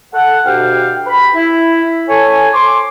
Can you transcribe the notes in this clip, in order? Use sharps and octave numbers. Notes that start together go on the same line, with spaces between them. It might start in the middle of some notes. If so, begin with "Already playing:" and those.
A4 F#5
D2 B2 G4 F5 G5
B5
E4
A4 C#5 G#5
C6 D6